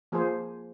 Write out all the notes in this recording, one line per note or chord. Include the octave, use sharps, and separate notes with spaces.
F3 A#3 G#4 C5